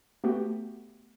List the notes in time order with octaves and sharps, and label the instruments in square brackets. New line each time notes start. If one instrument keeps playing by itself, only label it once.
[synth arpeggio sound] A3 B3 F#4 G4